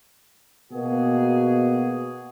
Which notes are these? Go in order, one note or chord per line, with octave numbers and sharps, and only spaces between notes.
B2 A#3 F#4 G#4